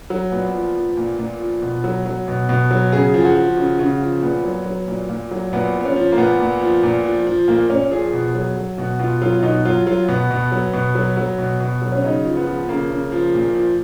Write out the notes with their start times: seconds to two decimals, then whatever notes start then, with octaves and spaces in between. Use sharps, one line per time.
0.10 F#3
0.32 A#2 B3
0.54 F3
0.75 F3
0.97 A#2
1.19 A#2
1.40 F3
1.62 B2
1.84 F#3
2.06 F#3
2.28 B2
2.49 B2
2.71 F#3
2.92 C#3 G#4
3.14 F3
3.21 G#4
3.25 F#4
3.36 F3
3.57 C#3
3.79 C#3
4.01 F3
4.22 A#2 B3
4.44 F#3
4.66 F#3
4.88 A#2
5.09 A#2
5.31 F#3
5.53 A#2 B3
5.74 F3
5.81 B3
5.85 C#4
5.96 F3
6.12 A#3
6.17 A#2 B3
6.40 A#2
6.62 F3
6.83 A#2
7.05 F3
7.27 F3
7.48 A#2 A#3
7.70 A#2 C#4
7.91 F3 G#4
8.13 B2
8.35 F#3
8.56 F#3
8.78 B2 F#4
8.99 B2 F4
9.21 F#3 F4
9.39 F4
9.43 B2 D#4
9.65 F#3 F4
9.87 F#3 F4
10.08 B2 B3
10.31 B2
10.52 F#3
10.73 B2
10.95 F#3
11.17 F#3
11.38 B2
11.60 B2
11.82 F#3
11.92 C#4
12.03 C#3 D#4
12.25 F3
12.37 B3
12.47 F3
12.69 C#3 A#3
12.90 C#3
13.12 F3
13.34 A#2
13.55 F3